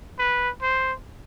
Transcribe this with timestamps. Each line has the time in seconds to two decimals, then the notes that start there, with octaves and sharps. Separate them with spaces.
0.19 B4
0.62 C5